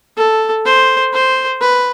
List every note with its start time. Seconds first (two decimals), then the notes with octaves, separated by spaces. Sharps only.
0.17 A4
0.66 C5
1.13 C5
1.61 B4